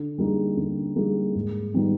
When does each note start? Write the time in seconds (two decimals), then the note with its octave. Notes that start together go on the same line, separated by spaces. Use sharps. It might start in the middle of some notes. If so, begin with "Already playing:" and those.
Already playing: D3
0.18 G3 A#3 D#4 G#4
0.57 D3
0.96 G3 A#3 D#4 G#4
1.35 G#2
1.74 D#3 G3 B3 D#4